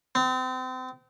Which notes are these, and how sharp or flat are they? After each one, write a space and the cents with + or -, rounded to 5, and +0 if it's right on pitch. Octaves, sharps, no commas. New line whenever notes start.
C4 -35